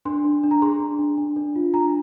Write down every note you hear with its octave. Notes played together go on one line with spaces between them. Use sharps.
D4 C6
D4
D4
A#5
G#4 C6
D4
D4
D4
D4
F4
D4 A#5